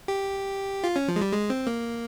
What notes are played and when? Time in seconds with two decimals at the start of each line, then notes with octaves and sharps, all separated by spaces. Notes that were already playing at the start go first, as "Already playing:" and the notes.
0.08 G4
0.84 F4
0.96 C#4
1.08 F3
1.16 G#3
1.21 G3
1.33 G#3
1.50 C4
1.67 A#3